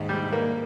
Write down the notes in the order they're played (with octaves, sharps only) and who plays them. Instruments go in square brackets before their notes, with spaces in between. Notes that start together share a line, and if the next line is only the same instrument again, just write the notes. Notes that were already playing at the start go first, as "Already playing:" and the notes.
Already playing: [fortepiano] D#2 [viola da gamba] G#2
[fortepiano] G3
A#3